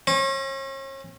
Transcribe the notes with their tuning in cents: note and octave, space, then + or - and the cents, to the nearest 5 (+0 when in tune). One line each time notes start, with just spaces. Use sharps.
C#4 -40